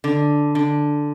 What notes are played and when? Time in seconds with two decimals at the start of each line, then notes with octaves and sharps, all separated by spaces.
0.04 D3
0.55 D3